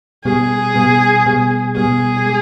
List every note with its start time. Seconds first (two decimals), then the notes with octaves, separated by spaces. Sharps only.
0.24 B2 G3 B3 G#4
0.75 B2 G3 B3
1.25 B2 G3 B3
1.76 B2 G3 B3 G#4
2.26 G#3